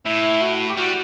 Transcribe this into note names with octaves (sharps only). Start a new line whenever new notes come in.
A2 E4
F#4
G4
G3 F#4